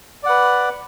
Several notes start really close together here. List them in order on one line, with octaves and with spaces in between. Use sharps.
D5 F#5 B4